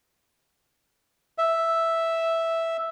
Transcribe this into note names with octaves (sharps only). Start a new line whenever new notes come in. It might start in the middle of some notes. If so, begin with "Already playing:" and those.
E5